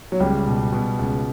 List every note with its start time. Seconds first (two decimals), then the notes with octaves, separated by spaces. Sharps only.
0.12 F#3
0.20 C#2 G3
0.46 B2
0.73 B2
0.99 C#2